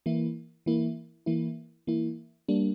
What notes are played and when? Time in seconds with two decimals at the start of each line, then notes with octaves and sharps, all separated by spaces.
0.06 E3 A#3 E4
0.66 E3 A#3 E4
1.26 E3 A#3 E4
1.87 E3 A#3 E4
2.48 G3 A#3 D4